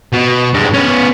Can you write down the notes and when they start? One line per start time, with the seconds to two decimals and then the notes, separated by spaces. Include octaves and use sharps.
0.13 B2
0.54 G2 G#3
0.73 B3 C#4